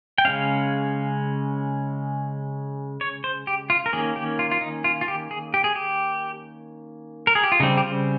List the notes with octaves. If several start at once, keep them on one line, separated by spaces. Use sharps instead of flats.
G5
C#3 G#3 C#4 F5
C#5
C5
G4
F4
A#4
D#3 A#3 C#4 G#4
G4
F4
F4
D#4
F4
F4
G4
G#4
G4
G#4
G4
A#4
G#4
G4
F4
C#3 G3 C4 D#4
G4
F4